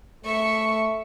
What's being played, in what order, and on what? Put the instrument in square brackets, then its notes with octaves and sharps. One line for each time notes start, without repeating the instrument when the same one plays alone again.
[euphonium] A3 [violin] E5 C#6